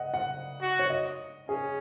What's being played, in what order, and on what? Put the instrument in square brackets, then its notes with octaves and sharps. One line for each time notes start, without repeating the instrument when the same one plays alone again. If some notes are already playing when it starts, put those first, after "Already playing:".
Already playing: [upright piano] D#5 F#5
F#5
[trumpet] F#4
[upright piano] C#5
D#5
[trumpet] C#4 [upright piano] G#4